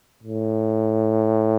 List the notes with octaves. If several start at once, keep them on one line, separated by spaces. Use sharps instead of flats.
A2